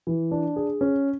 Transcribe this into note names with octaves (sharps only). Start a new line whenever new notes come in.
E3
D4
G#4
C#4